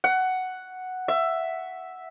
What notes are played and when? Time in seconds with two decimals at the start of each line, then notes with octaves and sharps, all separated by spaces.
0.04 F#5
1.08 E5